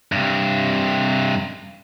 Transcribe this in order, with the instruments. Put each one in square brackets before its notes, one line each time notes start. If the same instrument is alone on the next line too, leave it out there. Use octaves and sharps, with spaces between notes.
[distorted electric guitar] G2 C3